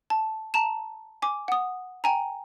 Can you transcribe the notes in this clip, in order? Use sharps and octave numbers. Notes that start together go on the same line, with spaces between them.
A5
A5 A#5 E7
G#5 D6
F#5 D#6
G5 G#5 A#5